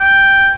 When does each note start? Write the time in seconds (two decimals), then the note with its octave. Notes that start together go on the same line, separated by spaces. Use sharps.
0.01 G5